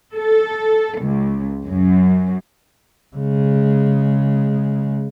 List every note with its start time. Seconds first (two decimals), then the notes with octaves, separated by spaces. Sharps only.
0.14 A4
1.02 C#2
1.66 F#2
3.16 C#3 G#3